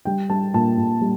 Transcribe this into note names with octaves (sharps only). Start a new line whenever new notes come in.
G3 G5
G3 A5
A#2 A5
A#2
G3